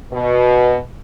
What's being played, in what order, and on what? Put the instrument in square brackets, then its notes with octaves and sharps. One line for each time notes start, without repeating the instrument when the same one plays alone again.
[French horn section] B2